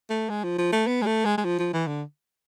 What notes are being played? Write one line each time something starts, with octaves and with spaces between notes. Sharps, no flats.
A3
G#3
F3
F3
A3
B3
G#3
A3
G#3
G#3
F3
F3
E3
D3